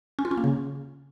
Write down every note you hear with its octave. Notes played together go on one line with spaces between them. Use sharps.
C#4
F4
C#4
A#3
C#3